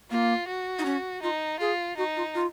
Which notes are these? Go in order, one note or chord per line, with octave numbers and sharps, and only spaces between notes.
A#3 F4
F#4
D#4
C#4
D#4 F4
F4 G#4
D#4 F#4
F4
F4